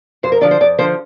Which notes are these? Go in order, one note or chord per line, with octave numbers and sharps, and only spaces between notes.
F2 C5
A#4
D3 F3 D5
C5
F2 D5
D3 F3 C5